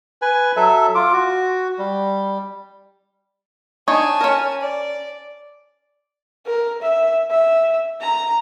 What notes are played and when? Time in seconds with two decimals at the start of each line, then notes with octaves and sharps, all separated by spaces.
0.22 B4 G#5
0.56 F#3 A4 E5
0.95 F4 D6
1.13 F#4
1.78 G3
3.88 D4 D#4 C#5 G#5 A5
4.21 C#4 A#4
4.61 D5
6.46 A#4
6.82 E5
7.30 E5
8.01 A#5